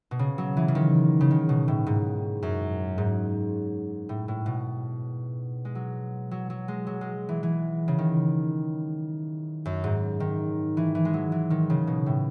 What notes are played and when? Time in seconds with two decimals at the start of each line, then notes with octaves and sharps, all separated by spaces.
0.11 B2
0.19 C#3
0.38 F#3
0.57 E3
0.68 C#3
0.75 D#3
1.21 C#3
1.31 D#3
1.49 B2
1.68 A2
1.86 G#2
2.42 F#2
2.98 G#2
4.09 A2
4.28 A2
4.46 B2
5.65 G#3
5.75 F#3
6.31 F#3
6.50 F#3
6.68 G#3
6.87 F#3
7.01 G#3
7.29 E3
7.43 E3
7.88 C#3
7.99 D#3
9.65 F#2
9.84 G#2
10.20 D#3
10.77 E3
10.95 E3
11.05 G#3
11.14 F#3
11.32 E3
11.50 D#3
11.70 C#3
11.87 B2
12.06 A2